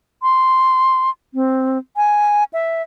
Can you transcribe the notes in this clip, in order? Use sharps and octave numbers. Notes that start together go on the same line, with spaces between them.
C6
C4
G#5
E5